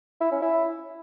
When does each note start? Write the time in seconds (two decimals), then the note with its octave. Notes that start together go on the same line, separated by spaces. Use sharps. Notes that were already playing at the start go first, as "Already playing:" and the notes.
0.21 E4
0.32 C#4
0.42 E4